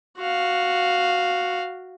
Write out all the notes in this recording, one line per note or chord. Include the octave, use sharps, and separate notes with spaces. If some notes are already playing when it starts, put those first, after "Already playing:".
F#4 F5